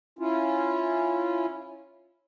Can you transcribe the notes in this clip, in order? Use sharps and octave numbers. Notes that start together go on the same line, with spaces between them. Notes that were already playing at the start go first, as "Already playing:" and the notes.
C#4 E4 F4